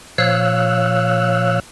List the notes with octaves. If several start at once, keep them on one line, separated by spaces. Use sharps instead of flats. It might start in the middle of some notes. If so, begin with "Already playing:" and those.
A#2 F3 C#5 F5 E6 F#6